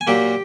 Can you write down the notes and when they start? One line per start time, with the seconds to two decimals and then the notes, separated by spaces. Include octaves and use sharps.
0.01 G#5
0.07 A#2 F#3 A#3 G4 G5